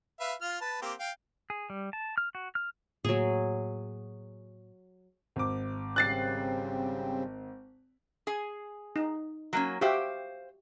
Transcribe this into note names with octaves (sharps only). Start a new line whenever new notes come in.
B4 E5 F5
F4 F6
B4 A5
A#3 C4 G4
F5 G5
G#4
G3
A5
F6
F#4
F6
A2 F#3 A#3 G#4
G#1 D6
C#3 G3 C4 F#6 A6 C7
G#4 G#5
D#4
F#3 A#3 C#4
F#4 G4 C5 E5 F5 G5